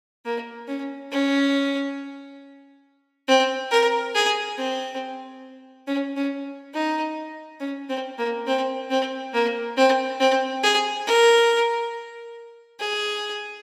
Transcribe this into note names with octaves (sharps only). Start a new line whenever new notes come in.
A#3
C#4
C#4
C4
A#4
G#4
C4
C#4
C#4
D#4
C#4
C4
A#3
C4
C4
A#3
C4
C4
G#4
A#4
G#4